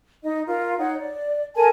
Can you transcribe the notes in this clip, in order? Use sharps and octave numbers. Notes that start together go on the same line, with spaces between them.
D#4 D#5
F4 A#4
D#4 C#5 F#5
D5
A4 A#4 G#5 A5